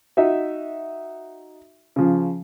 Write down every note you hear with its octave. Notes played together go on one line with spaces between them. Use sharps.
D#4 F#4 E5
C#3 F3